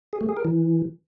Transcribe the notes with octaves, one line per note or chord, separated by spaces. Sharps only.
G#4
A3
G#4
A#4
E3